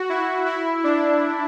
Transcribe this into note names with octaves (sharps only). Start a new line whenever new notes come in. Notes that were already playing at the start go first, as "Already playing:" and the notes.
Already playing: F#4
E4
E4
D4